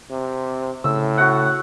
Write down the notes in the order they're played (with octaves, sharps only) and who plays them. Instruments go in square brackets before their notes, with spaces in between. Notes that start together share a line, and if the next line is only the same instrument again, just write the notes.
[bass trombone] C3
[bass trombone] A2 [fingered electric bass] C#3 [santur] E6
[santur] F#4 F#5